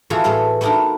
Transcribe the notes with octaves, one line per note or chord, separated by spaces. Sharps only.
E3 F4 F#4 G#4 A4 A#5
A2 C4 C#4 G#4 A4
A3 B3 D4 D#4 F#4 A#4